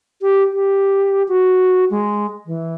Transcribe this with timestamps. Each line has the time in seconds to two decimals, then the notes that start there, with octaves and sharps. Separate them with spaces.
0.22 G4
0.53 G4
1.28 F#4
1.90 G#3
2.46 E3